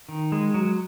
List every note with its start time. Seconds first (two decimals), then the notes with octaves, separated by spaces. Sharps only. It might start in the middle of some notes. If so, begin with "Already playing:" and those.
0.09 D#3
0.32 G#3
0.54 F#3